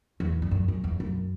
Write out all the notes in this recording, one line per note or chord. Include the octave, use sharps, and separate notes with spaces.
E2
G2
F#2
F#2
E2
F#2